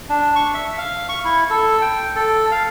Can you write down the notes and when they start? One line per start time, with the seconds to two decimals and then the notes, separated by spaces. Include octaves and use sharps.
0.09 D4
0.36 C#6
0.54 E5
0.78 F5
1.09 C#6
1.24 E4
1.50 A4
1.82 G5
2.16 A4
2.51 F5